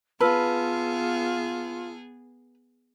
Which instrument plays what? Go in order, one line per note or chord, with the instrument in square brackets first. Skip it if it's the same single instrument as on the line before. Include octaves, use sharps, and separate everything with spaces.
[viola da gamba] B3 G#4 [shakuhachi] F4 [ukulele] B4 [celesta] A5 E6 F6